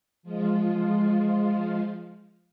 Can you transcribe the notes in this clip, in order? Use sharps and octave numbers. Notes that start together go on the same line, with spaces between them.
F3 G#3 F4